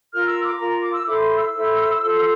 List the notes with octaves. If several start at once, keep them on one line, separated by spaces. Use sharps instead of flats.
F4 A#4 F6
E6
D6
F4 A#4 A#5
D6
E6
E4 A4 C5 D6
C6
E6
E4 A4 C5
F4 A4 C5